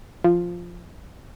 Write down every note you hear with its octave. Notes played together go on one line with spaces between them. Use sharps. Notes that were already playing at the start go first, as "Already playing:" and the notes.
F3